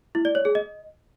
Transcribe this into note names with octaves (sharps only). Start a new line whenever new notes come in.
E4
D5
C#5
G#4
D#5